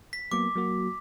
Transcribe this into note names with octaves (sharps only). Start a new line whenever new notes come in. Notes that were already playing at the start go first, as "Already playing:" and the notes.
B6
F#3 A#3 B3 D6
F#3 A#3 F#4